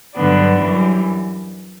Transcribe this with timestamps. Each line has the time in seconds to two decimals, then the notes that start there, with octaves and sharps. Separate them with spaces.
0.15 G2 D3 F#3 B3 D4
0.59 F#2 E3 G3